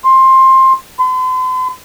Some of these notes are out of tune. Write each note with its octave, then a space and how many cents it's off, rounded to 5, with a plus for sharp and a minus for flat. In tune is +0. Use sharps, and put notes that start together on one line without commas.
C6 +15
C6 -45